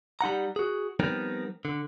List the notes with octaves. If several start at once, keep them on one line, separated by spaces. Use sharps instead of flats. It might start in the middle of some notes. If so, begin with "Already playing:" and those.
G3 D#4 F#5 A#5
F#4 G#4
F3 G3 B3 C4 D#4 A#4
D3